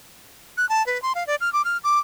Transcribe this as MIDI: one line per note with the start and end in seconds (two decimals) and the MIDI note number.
0.57 0.68 90
0.69 0.85 81
0.86 1.00 71
1.02 1.13 84
1.15 1.26 77
1.27 1.35 74
1.41 1.52 89
1.53 1.62 86
1.65 1.77 89
1.84 1.98 86